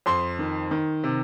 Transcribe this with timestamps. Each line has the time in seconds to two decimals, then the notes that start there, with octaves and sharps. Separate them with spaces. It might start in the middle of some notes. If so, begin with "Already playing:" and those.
0.06 F2 C6
0.39 D#3
0.71 D#3
1.03 C3